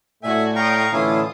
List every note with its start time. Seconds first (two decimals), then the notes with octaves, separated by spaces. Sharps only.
0.23 A2 A3 F#4 D5 E5 G#5
0.56 F5 G5 A#5 C#6 D#6
0.92 A2 D3 E3 C#4 E4 F4 D#6